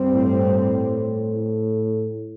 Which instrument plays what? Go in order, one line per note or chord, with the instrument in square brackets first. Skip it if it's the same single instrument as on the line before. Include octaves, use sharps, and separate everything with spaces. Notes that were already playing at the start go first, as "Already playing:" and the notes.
Already playing: [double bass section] G2 G3 C4
[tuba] A2